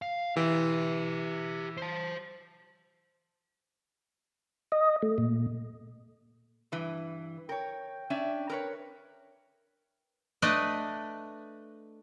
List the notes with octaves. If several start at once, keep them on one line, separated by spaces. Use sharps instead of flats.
F5
E3 G4 E5
C5 A5
D#5
A3
A#2
G2 E3
A#4 C#5 G5
C#4 D4 E5
A#4 B4 C#5
A3 D4 B4 D#5